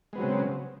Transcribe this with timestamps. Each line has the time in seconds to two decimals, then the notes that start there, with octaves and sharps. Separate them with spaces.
0.13 G#3
0.15 B3
0.18 F#3
0.20 C4
0.23 C#3